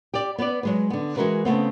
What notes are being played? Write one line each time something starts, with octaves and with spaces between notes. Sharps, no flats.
G4 D5
B3 B4 C5 D5
F#3 G#3 B4
D3 B3
E3 F3 G#3 F#4 A#4 B4
C#3 A3 B3 C4